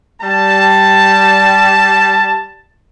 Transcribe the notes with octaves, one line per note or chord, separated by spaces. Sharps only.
G3 A5